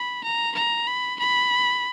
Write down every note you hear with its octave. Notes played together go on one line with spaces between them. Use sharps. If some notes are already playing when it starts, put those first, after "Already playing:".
Already playing: B5
A#5
A#5
B5
B5